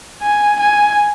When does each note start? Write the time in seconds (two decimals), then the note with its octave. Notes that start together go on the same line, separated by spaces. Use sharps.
0.22 G#5
0.60 G#5